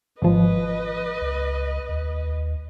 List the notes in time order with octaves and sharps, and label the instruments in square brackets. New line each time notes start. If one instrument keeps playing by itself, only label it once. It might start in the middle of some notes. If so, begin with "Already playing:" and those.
[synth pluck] G#1 F3 [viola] B4 D#5
[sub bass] C#2
D#2